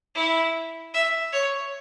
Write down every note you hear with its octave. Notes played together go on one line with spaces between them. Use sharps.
E4
E5
C#5